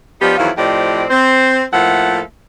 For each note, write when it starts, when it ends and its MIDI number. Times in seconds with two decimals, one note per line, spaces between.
0.22 0.36 53
0.22 0.36 59
0.22 0.36 62
0.22 0.36 63
0.22 0.36 67
0.38 0.50 40
0.38 0.50 51
0.38 0.50 53
0.38 0.50 54
0.38 0.50 64
0.38 0.50 77
0.57 1.04 45
0.57 1.04 53
0.57 1.04 60
0.57 1.04 67
0.57 1.04 74
0.57 1.04 75
1.11 1.63 60
1.11 1.63 72
1.73 2.20 45
1.73 2.20 53
1.73 2.20 58
1.73 2.20 69
1.73 2.20 76
1.73 2.20 78